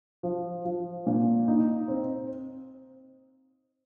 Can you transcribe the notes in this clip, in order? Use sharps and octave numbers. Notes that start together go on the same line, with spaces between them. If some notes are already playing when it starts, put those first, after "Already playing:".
F3
F3
A#2
D#4
C4